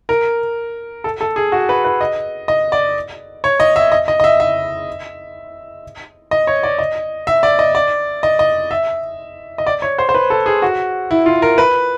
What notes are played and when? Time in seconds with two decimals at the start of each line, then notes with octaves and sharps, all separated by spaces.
0.09 A#4
1.04 A4
1.21 A4
1.36 G#4
1.52 F#4
1.69 B4
1.85 B4
2.01 D#5
2.48 D#5
2.72 D5
3.44 C#5
3.60 D#5
3.76 E5
3.92 D#5
4.08 D#5
4.20 D#5
4.24 E5
4.40 E5
6.31 D#5
6.47 C#5
6.63 D5
6.79 D#5
7.27 E5
7.43 D5
7.59 D#5
7.75 D5
8.23 D#5
8.39 D#5
8.71 E5
9.58 D#5
9.67 D5
9.82 C#5
9.99 C5
10.09 C5
10.14 B4
10.30 A4
10.46 G#4
10.62 F#4
11.11 E4
11.26 F4
11.42 A#4
11.58 B4